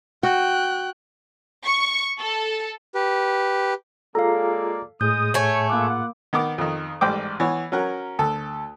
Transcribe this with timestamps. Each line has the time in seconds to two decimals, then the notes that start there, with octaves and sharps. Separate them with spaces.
0.23 F#4 G5 F#6
1.64 C#6
2.19 A4
2.95 G4 B4
4.15 G#3 A#3 F4 G#4 A4 D5 F5 A#5
5.01 A2 G#3 G#4 D#6 G6
5.34 A3 C#5 G#5
5.70 A#3 F4 F#5 D6
6.33 D#3 B3 A#4 D6
6.58 F2 D#3
7.01 A1 G#2 G3 C5 G5 D6
7.40 E3 B3 C#5
7.72 F#3 C#4 A#4 F#5
8.19 D2 A4